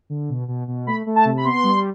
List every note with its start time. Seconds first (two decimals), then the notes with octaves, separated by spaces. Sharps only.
0.10 D3
0.29 B2
0.48 B2
0.68 B2
0.87 A3 B5
1.06 A3
1.16 A5
1.25 C3
1.37 B5
1.44 B3 C6
1.64 G3